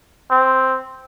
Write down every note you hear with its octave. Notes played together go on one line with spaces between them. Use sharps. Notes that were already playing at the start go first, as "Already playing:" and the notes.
C4